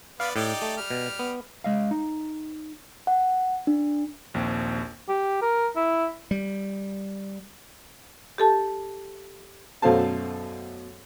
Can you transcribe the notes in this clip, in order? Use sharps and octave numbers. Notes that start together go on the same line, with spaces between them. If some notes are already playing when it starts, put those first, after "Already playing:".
B3 B4 D5 F5
A2 D#4 G4 D5
A3
G3 F6
B2
B3
G#3 D#5 F5
D#4
F#5
D4
A#1 D#2 C4
G4
A#4
E4
G3
G4 A4 A5
F#2 B2 A3 C5 F5 A5